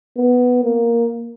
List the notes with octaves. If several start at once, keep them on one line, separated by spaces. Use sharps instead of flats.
B3
A#3